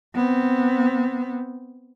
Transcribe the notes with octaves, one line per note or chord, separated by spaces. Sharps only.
B3 C4